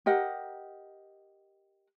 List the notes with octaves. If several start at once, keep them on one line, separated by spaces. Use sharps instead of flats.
G4 A#4 D#5 F#5